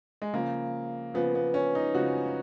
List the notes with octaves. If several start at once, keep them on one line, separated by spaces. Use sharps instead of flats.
G#3
C#3 F3 A#3
C#3 F3 B3
B3
C#4
D#4
C#3 F3 F#4